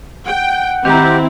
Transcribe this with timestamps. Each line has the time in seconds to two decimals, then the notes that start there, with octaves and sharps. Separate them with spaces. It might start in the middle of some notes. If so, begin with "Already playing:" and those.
0.27 F#5 G5
0.85 D#3 C4 E4 G4 A#5